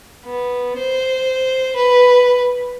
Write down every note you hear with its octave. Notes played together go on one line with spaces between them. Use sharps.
B3
C5
B4